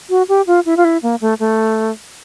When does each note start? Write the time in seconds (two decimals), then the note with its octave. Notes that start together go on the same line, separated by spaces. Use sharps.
0.10 F#4
0.29 G4
0.47 F4
0.66 E4
0.77 F4
0.85 E4
1.03 A#3
1.21 A3
1.40 A3